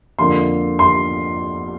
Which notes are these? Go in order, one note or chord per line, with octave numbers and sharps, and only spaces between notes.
F2 D3 A#3 C6
C6